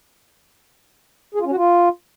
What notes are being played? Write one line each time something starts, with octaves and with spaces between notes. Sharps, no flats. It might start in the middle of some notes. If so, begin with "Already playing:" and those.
G#4
F4
C#4
F#4
F4